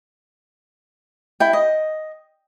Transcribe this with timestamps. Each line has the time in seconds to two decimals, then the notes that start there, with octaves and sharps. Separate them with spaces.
1.40 E4 G5
1.53 D#5